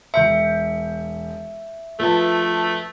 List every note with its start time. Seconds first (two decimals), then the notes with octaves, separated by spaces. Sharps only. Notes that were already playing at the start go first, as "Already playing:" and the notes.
0.14 E1 E5 G6 C#7
2.00 F3 A3 B4 A5